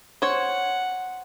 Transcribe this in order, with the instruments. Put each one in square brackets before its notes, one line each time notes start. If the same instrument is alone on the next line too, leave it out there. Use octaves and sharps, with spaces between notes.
[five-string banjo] C5 C#5 [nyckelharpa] F#5